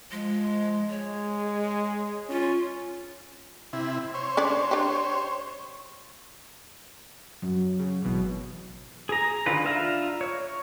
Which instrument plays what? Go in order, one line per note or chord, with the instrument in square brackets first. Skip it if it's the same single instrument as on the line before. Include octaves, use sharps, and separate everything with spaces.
[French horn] F3 [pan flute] G#3
[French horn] G#3 [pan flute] C#5
[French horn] C#4 [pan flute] F4
[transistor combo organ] C3 E4
C5 C#5
[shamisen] C#4 D4 D5
D4 G4
[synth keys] F#2 [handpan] F#3
[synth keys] C#3
[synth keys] G#1 B2 E3 [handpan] F#3
[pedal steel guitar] G#4 A#5
D3 D#3 F4 B4
D4 F4 E5 F5 A#5
C#5